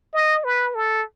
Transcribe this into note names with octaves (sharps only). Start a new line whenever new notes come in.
D#5
B4
A4